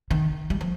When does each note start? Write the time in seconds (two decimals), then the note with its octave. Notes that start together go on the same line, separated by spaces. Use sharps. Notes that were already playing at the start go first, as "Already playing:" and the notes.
0.11 D#3
0.50 G3
0.61 F3